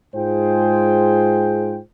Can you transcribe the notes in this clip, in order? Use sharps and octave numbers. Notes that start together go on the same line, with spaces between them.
G#2 G#3 F4 G#4 C5 G5